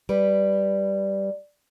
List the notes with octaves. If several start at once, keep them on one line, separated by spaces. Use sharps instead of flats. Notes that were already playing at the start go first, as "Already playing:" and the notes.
G3 B4 D5